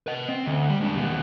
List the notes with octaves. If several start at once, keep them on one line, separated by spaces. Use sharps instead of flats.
B4 D#5
C4
D2
G3
G#3 D4
D#2 B2